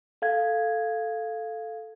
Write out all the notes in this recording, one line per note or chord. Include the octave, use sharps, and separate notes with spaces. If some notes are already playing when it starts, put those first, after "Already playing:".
A4 F5 G#6